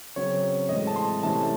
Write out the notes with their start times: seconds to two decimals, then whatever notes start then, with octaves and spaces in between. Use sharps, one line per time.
0.16 C#3 F#3 C4 C#5
0.69 A2 E3 G#3 C4 D#5
0.87 A5
0.96 C6
1.23 C3 E3 A3 C#4 A5